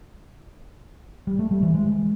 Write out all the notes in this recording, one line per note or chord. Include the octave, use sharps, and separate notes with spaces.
G3
A3
G3
E3
G#3